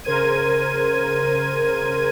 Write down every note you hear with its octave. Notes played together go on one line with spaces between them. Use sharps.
C#3 A#4 C5 G#6 D#7